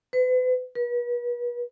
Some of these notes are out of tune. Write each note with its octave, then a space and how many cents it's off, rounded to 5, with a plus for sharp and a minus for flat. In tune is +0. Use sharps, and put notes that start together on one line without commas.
B4 +40
B4 -40